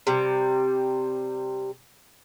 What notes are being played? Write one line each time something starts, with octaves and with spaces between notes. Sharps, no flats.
C3 G3